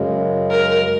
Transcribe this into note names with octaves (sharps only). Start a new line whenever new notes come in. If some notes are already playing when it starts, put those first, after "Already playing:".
Already playing: F#2 C#3 G#3
A#4